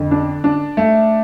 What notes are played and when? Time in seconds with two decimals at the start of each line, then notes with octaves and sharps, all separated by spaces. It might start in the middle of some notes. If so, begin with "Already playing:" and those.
Already playing: F2 D3
0.11 D4
0.44 D4
0.77 A3